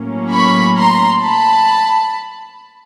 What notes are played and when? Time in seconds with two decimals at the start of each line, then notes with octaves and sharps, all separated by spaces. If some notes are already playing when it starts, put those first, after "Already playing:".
Already playing: A2 F#3 A#3 C#4
0.32 B5 C#6
0.77 A#5 C6
1.21 A5 B5